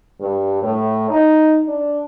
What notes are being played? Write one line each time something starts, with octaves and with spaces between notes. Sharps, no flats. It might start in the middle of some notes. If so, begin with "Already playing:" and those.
G2
A2
D#4
D4